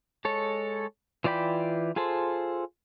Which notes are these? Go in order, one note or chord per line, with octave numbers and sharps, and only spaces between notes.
G#3 A4 C#5
E3 F4 D5 G5 B5
F4 G#4 A4 C5